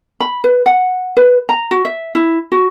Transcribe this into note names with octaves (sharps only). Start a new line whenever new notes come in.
B5
B4
F#5
B4
A#5
F#4
E5
E4
F#4